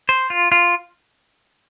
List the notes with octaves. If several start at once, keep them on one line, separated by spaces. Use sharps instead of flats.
C5
F4
F4